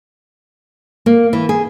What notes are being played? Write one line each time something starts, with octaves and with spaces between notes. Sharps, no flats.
A#3
E3
G#4